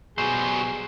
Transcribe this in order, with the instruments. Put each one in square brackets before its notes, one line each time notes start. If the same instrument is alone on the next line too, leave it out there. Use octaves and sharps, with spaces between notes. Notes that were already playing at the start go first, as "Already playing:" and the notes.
[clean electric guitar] B2 C5 [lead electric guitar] F#3 G3 [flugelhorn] G#4